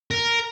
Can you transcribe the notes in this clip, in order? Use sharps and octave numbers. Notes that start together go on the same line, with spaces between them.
A#4